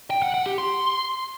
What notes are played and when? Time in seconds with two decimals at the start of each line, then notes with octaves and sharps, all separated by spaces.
0.10 G5
0.22 F#5
0.34 F#5
0.46 G4
0.58 C6